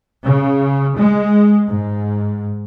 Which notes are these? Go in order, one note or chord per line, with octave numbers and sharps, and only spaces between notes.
C#3
G#3
G#2